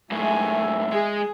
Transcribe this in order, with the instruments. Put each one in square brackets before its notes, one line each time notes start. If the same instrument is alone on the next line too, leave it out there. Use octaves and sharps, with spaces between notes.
[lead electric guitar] F#2 A2 [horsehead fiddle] G#3 G#5 [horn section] E5
[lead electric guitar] G#3 [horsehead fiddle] G#4